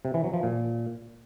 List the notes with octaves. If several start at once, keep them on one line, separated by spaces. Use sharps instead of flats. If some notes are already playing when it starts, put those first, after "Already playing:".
C3
E3
F#3
F3
A#2